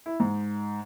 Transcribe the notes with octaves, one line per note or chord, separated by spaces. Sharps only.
E4
G#2